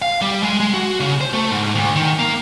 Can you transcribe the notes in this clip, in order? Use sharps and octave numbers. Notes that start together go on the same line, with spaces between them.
F5
G3
G#3
G#3
F#4
C#3
C5
A3
G#2
D2
D#3
A#3